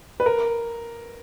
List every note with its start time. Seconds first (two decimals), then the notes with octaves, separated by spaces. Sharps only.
0.20 B4
0.26 A#4